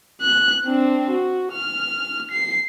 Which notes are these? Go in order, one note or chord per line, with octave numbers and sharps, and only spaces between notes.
F#6
C4 D4
F#4
F6
C7